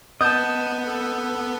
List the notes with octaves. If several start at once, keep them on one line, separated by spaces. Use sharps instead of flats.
B3 D#5 A5 D#6 G6
A4